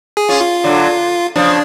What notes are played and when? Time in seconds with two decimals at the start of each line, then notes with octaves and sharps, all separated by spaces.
0.17 G#4
0.29 C#4 F4
0.41 F4
0.64 D3 F#3
1.36 C#3 F3 D4